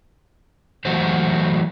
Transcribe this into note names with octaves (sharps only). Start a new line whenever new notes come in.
E3 F#3 A3 F#4 G4 C5